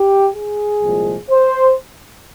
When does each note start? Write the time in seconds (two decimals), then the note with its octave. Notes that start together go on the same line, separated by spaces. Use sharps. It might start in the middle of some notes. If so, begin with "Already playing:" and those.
Already playing: G4
0.34 G#4
0.82 C2 A#2 F3 G#3
1.30 C5